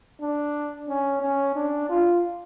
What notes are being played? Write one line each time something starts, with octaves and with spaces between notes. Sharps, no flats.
D4
C#4
C#4
D4
F4